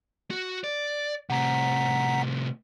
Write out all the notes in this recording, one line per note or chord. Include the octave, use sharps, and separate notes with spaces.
F#4
D5
A2 C3 F#5 A#5 B6